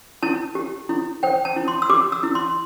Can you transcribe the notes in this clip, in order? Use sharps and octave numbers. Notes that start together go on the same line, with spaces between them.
E4 A5
G4
E4
C5 G5
A5
E4
C6
E6
G4 D6
E6
E4
C6